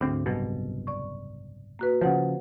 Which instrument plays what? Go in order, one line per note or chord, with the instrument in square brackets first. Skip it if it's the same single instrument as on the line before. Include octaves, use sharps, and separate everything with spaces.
[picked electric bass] D2 C4 [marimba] G#2 D4
[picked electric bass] F#1 C2 B2
[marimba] D5 C#6
A#3 F#4 B4
[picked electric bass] C#3 F3 [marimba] C5 F#5